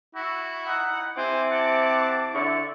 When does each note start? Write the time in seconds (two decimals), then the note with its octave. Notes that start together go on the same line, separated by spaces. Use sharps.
0.15 E4 F#4
0.66 D#4 F#5
1.18 C3 C4 E4 C5 G#5 D6
1.51 F#5 A5
2.34 D3 E4 C#6